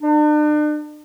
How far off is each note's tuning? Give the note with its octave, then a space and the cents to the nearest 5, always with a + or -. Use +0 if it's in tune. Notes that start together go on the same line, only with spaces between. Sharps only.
D4 +40